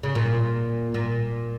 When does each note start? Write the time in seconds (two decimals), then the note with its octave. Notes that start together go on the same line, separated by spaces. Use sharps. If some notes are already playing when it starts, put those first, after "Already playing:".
0.03 C#3
0.15 A#2
0.94 A#2